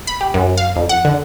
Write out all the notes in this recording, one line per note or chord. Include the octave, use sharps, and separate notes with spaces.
B5
G4
F#2
F5
F2
F#5
D3